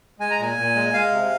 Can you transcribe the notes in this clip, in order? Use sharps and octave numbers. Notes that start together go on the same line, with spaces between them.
G#3 G#5
A#5
A#2 G#5
A#2
G#3
G#3 F5
C3